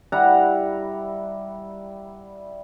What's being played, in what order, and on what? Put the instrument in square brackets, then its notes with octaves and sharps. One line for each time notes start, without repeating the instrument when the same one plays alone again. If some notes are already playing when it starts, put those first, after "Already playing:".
[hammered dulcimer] G3 E4 F#5 A#5